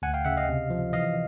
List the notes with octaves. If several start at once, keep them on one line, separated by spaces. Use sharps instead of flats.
D2 F#5 G#5
F5 G5
C#3 E5 F#5
D#5 F5
C3
F3
E3 D#5 F5